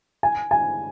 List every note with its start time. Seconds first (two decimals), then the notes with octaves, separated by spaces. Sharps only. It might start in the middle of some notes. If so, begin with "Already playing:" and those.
0.23 G#5
0.51 G#5